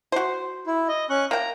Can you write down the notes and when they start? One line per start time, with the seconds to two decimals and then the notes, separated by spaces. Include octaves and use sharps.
0.12 F#4 C5
0.67 E4
0.88 D#5
1.10 C#4 C#6 F#6
1.31 A#3 G5 A#5